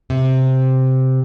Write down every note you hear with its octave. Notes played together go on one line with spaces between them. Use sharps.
C3